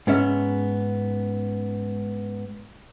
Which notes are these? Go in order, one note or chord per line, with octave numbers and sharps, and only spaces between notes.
G#2 B3 C#4 E5